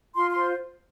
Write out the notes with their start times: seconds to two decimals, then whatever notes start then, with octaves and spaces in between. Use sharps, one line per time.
0.15 F4 C6
0.31 C6
0.37 C5